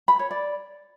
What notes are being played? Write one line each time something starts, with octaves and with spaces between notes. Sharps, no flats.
B5
C#5
D5